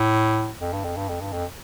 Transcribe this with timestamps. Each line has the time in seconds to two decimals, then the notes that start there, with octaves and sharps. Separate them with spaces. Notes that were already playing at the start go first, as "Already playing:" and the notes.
Already playing: A2
0.61 F2
0.73 G2
0.84 F2
0.97 G2
1.09 F2
1.21 G2
1.33 F2